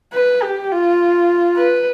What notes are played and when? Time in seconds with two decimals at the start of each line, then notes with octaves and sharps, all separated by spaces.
0.13 B4
0.42 G4
0.71 F4
1.56 B4